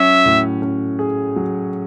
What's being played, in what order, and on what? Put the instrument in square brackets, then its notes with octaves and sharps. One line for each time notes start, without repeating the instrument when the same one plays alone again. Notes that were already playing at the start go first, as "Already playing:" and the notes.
Already playing: [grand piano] F#3 C#4 [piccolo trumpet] E5
[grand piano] A2
C#4
G#4
F#3